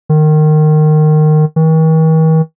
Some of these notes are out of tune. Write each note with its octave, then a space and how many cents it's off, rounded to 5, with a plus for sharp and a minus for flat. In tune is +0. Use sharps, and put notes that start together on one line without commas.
D#3 -20
D#3 +45